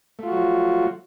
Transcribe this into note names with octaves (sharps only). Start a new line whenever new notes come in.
F3 F#3 A3 F4 F#4